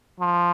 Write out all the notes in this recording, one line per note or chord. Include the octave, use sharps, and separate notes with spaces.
F3